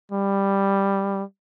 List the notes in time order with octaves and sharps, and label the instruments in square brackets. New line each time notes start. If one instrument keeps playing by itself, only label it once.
[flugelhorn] G3